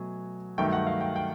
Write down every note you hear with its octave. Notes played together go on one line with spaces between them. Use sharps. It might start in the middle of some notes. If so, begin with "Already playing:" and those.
Already playing: B2 F#3 A3 G#5
G2 D#3 F#3 A3 G5
G5
F#5
F5
G5
G5